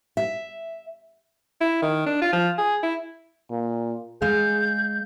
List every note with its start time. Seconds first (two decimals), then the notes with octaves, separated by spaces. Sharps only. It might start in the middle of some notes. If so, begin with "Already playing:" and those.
0.17 E5
1.61 E4
1.82 D#3
2.06 D4
2.22 F4
2.33 F3
2.58 G#4
2.83 E4
3.51 A#2
4.22 G#3 G#4 F5 G6